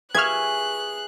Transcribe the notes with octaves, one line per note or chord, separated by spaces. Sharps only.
G#4 B4 E5 C#6 F6 F#6 G#6